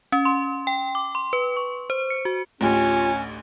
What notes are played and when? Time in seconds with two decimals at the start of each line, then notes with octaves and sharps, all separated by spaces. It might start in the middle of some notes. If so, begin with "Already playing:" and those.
0.12 C#4
0.25 C6
0.67 G5
0.95 D6
1.15 C6
1.33 B4
1.57 C#6
1.90 C5
2.10 C#7
2.25 F#4
2.61 A1 D2 C#4 F4 G4